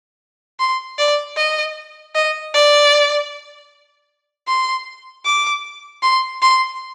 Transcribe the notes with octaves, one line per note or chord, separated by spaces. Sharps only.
C6
D5
D#5
D#5
D5
C6
D6
C6
C6